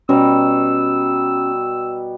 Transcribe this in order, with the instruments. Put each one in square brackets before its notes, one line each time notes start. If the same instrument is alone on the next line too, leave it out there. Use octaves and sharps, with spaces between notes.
[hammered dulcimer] B2 G3 A#5 [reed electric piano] C#4 [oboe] E6